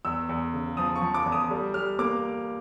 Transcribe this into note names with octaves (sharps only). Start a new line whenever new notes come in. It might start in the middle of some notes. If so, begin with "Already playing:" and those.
E2 E6
E2
C#3
F3 D#6
C#6
F3
D6
E2
D#6
G3
G3 F6
A#3 D6